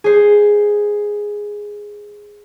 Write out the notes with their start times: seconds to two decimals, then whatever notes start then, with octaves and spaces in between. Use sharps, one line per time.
0.04 G#4 C5